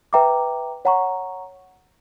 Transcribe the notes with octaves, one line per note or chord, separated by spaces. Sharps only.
B4 E5 G5 A#5 D6
C#5 F#5 A#5 C#6